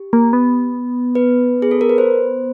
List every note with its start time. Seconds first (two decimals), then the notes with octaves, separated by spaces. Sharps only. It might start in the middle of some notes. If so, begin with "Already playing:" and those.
Already playing: G4
0.13 A#3
0.33 B3
1.15 B4
1.62 G#4
1.71 A4
1.81 A#4
1.89 B4
1.98 C5